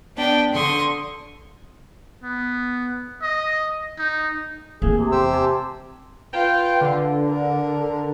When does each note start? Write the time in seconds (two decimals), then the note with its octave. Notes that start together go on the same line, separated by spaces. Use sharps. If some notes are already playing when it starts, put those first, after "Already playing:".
0.17 B3 D4 G5
0.52 D3 C6 C#6 D#6
2.23 B3
3.22 D#5
3.99 D#4
4.82 A2 A3 A#3 C4 G#4
4.98 C3
5.12 E2 G4 C5 E6
5.33 G#5 A5
6.33 F4 B4 G5
6.81 D3
7.28 A#4